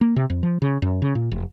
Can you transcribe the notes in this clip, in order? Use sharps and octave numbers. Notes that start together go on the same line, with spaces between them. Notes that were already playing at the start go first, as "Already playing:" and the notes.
A#3
C3
F2
F3
C#3
F#2
C#3
A#2
F1